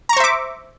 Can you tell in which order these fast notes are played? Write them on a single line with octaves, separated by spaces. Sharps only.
A#5 C#6 C5 E5 D6